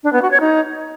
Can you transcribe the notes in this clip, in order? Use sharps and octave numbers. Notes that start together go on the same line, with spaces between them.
D4
B3
F#4
C#5
D#4